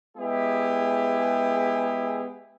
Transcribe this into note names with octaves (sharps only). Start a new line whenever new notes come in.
G#3 B3 E4 G4 G#4